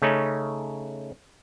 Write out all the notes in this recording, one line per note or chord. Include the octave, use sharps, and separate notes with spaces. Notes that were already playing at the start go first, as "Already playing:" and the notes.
C#3 A3 C#4 D#4